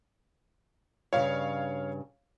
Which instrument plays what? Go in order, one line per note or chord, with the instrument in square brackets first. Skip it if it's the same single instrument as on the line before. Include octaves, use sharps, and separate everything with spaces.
[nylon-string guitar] G2 C#3 [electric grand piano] C#5 F5